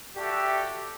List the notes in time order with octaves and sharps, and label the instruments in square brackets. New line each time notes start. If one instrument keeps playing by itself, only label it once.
[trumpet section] F#4 G4 A4 D5 E5 G5